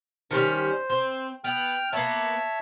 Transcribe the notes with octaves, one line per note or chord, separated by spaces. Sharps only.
D#3 G3 C#4 C5
C4
B3 G5 F6
A#3 B3 C#5 E5 A5